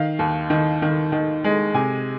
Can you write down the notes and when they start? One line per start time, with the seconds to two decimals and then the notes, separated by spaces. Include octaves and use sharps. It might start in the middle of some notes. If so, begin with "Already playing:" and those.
Already playing: D#3 F5
0.19 D#2
0.50 D#3
0.82 D#3
1.12 D#3
1.44 G#3
1.74 C3 G#5